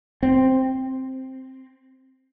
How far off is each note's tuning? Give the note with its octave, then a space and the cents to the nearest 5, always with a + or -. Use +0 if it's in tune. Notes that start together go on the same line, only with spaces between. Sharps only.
C4 +5